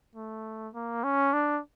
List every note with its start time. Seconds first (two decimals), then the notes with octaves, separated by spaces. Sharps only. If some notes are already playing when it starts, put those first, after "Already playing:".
0.16 A3
0.74 A#3
1.04 C#4
1.33 D4